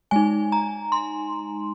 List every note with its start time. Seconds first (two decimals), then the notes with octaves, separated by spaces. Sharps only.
0.11 G#3 D#4 G#5
0.52 A#5
0.92 C6